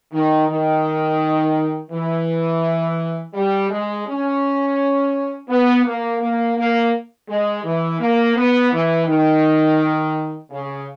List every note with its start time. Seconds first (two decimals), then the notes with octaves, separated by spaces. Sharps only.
0.12 D#3
0.48 D#3
1.91 E3
3.34 G3
3.70 G#3
4.06 C#4
5.49 B3
5.85 A#3
6.20 A#3
6.57 A#3
7.28 G#3
7.64 E3
8.00 A#3
8.36 B3
8.71 E3
9.07 D#3
10.51 C#3